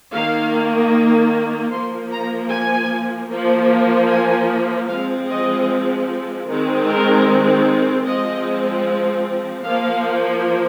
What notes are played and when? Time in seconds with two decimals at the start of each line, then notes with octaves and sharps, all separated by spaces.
0.12 D#3 A#3 F5
1.71 F3 A#3 C6
2.11 A#5
2.50 G#5
3.29 F3 A#3
4.08 G#5
4.87 F3 G#3 C4 F5
5.27 D#5
6.47 D#3 G#3 C4
6.86 A#4
8.04 F3 G#3 C4 D#5
9.63 F3 A#3 F5